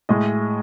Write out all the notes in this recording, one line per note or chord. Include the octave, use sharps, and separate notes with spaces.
A2 G#3 D#5